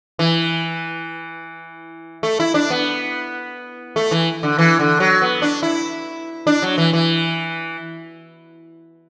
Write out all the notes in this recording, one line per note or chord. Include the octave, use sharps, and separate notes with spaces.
E3
A3
E4
D4
B3
A3
E3
D3
E3
D3
F#3
B3
D4
E4
D4
F#3
E3
E3